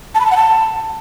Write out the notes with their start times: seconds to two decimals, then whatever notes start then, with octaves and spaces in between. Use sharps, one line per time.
0.15 A5
0.20 B5
0.26 A5
0.31 F#5
0.37 A5